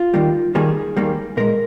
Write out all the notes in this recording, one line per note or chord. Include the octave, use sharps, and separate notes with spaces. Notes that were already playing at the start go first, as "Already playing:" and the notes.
Already playing: F4
D#2 D#3 G3 A#3
D#2 D#3 G3 A#3 G#4
D#2 D#3 G3 A#3
A#2 G#3 A#4